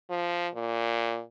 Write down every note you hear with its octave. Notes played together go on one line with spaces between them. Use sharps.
F3
A#2